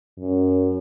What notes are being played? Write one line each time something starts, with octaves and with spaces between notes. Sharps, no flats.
F#2